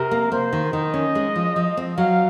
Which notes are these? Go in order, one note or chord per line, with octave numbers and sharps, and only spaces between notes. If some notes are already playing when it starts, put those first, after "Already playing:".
Already playing: C3 A#4
A#3
A#3 C5
D#3
D#3 D#5
C#4
G#3
F3
F3
C4
F#3 F5